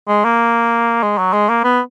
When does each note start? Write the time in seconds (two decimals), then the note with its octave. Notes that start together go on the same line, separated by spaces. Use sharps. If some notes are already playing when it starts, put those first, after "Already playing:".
0.08 G#3
0.25 A#3
1.03 G#3
1.18 F#3
1.33 G#3
1.49 A#3
1.64 B3